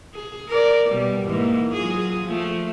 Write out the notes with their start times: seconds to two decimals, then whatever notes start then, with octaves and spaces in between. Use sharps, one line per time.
0.14 G#4
0.49 A#4 D5
0.90 B2 G3
1.27 G#2 E3 A#3
1.74 F#3 F4 G#4
2.25 F3 A3